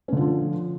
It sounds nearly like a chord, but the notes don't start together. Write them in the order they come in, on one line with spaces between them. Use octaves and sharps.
C#4 D3 F4 F3